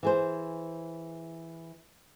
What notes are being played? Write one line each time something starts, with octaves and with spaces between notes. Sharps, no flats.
E3 G#4 C5